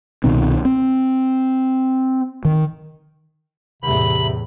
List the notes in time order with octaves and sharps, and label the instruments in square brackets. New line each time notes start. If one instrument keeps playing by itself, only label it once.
[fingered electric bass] C2 B2 D#3 C4
C4
D#3
[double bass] E2 A2 [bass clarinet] C3 [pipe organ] B5